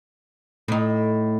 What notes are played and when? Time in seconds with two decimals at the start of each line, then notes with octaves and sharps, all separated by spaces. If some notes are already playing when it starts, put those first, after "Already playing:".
0.68 A2 D#4